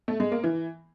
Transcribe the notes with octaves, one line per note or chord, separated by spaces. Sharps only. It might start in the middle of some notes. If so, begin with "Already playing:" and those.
A3
G#3
A#3
E3